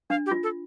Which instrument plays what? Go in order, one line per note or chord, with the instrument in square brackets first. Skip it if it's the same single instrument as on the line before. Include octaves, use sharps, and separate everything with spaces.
[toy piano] D4 [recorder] F5
[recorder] G4
[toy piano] F4
[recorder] A4